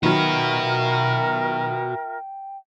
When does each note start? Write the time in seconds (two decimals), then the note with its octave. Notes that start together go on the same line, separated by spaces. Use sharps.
0.03 D#3 F#3 F4 F#4 A#4 B4 E5 G5